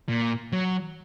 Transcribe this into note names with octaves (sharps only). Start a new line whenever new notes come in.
A#2
F#3